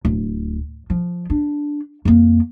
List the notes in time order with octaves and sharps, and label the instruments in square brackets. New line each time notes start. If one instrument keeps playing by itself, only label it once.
[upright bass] D1
F3
D4
F2 A#3